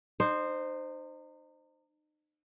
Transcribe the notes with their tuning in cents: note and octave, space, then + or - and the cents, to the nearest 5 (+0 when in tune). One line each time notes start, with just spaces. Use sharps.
D#4 -35 C5 +0